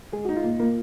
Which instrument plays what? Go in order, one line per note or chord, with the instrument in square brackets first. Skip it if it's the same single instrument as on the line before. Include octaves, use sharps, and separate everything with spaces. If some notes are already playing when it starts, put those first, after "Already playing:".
[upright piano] G#3 [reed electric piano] G#4
[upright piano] D#4 [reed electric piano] F#4
[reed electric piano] F4
[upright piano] A#2
A#3